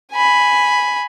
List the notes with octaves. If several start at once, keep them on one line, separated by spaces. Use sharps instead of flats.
G#5 B5